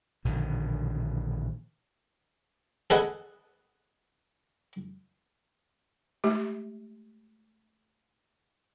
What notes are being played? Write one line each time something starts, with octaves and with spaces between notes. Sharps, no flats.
A#1 B2 D3 D#3
G#4 A4 B4 D#5 F#5 G#5
G#3 A3 G4